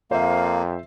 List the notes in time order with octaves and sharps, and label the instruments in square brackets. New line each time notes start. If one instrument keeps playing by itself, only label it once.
[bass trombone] F2 [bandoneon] A#3 [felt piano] C5 E5 [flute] F5